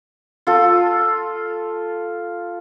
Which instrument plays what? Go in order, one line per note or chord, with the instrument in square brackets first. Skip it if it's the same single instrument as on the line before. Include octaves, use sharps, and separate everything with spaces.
[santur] F4 A4